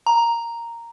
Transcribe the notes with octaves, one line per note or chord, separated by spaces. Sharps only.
A#5